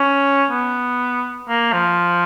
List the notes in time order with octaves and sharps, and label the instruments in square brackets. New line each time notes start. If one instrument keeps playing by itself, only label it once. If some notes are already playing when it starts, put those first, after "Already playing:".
Already playing: [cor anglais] C#4
B3
A#3
F3